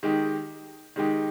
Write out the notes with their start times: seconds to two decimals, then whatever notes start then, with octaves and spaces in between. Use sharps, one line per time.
0.03 D#3 G#3 D#4 G4
0.96 D#3 G#3 D#4 G4